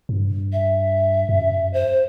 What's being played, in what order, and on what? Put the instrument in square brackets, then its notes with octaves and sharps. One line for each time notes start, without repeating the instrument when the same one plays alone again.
[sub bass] G2
[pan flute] E5
[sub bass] F#2
[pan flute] C5